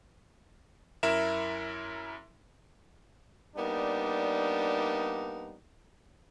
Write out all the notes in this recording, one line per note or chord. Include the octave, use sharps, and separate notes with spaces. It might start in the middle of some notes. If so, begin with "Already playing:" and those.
F#2 E4 A#4 E5 E7
G3 A#3 B3 D4 D#4